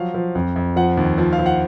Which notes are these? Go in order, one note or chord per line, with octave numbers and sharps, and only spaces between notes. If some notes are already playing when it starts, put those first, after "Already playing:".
Already playing: F3 F#3 F5
F3
F2
F2
F3 F#5
D#2
F3
F5
F3
F#5